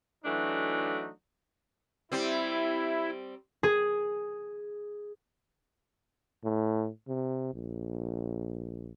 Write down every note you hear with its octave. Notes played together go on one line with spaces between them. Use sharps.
E3 F#3 A3 D4 D#4 F#4
G3 C4 E4
G#4
A2
C3
A#1